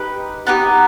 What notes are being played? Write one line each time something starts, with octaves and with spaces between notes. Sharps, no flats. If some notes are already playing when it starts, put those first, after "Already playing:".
Already playing: D#4 G4 B4 G5
B3 D#4 G4